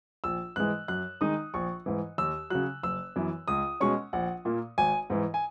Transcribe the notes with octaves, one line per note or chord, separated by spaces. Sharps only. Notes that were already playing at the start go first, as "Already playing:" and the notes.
A#1 E6
G#2 E3 G#3 F#6
F#2 F#6
D#3 G#3 D#4 D#6
A#1 C#6
G#2 E3
D#2 E6
C#3 F#3 F#6
F#1 E6
F#2 E3 B3
C#2 D#6
B2 G#3 C#4 C#6
A#1 F#5
A#2 A#3
G#1 G#5
G#2 E3
G#5